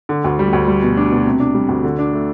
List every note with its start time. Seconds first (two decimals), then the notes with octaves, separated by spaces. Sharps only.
0.09 D3
0.24 D2
0.39 G3
0.53 D2
0.68 G3
0.83 B2
0.97 D4
1.12 B2
1.26 C3
1.40 D4
1.54 G3
1.69 D2
1.84 D3
1.99 D4
2.13 A3